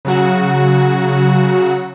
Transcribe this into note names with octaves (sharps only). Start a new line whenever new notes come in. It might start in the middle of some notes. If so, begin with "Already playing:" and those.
C#3 F#3 F#4